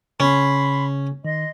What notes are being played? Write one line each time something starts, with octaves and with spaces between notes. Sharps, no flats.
C#3 C#4 B5 C6
D#3 D#5 C6